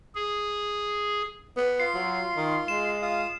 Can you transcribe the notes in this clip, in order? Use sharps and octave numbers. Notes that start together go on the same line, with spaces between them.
G#4
B3
F4 C6 C7
F#3
D#3
G#3 E7
F4 F5 D#6